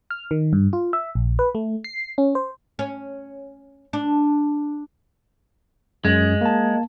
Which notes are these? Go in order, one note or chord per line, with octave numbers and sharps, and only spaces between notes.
F6
D#3
G2
F4
E5
A#1
B4
A3
C7
C#4
C5
C#4
D4
F#2 G#3
A#3 A5